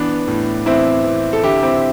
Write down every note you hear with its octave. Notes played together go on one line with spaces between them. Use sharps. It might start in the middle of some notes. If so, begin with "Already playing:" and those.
Already playing: E3 B3 D4
A2
E3 C4 E4
E3
A4
D3 E4 G4
C4 E4